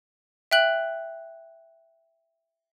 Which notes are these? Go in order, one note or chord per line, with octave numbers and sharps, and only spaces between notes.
E5 G5 F#6 F#7